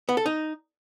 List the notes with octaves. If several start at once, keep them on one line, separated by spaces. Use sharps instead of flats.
B3
A4
D#4